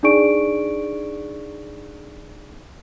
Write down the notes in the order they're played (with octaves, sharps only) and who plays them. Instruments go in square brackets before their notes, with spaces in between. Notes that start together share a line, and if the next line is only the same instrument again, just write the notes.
[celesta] D4 D#4 G#4 D5 C#6 D7